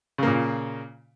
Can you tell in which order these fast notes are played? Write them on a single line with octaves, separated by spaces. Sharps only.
C#3 A#3 A#2